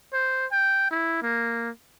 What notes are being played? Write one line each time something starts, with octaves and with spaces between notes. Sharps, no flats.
C5
G5
E4
A#3